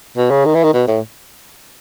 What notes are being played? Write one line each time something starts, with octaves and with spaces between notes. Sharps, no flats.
B2
C#3
D#3
E3
D#3
B2
A2